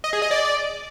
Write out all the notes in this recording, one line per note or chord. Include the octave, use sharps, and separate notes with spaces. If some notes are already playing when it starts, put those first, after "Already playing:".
D#5
G#4
D#5
D5